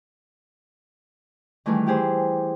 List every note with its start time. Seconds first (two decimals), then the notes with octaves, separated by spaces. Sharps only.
1.66 D#3 E3 G3 A3 G#4 B4
1.87 E4 G4 G#4 C5